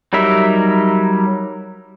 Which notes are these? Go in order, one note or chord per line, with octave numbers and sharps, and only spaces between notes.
F#3 G3 D#4 A#4 E5